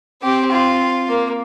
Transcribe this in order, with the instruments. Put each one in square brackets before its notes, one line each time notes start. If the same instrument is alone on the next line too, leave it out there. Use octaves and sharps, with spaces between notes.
[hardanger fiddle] C4 [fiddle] G4
[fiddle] F4
[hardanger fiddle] A#3